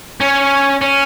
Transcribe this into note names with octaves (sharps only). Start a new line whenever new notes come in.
C#4
C#4